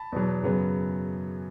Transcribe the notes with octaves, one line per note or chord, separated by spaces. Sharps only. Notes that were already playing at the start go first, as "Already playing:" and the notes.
Already playing: A5 B5
E2 B2 F#3
F#2 C#3 F#3 B3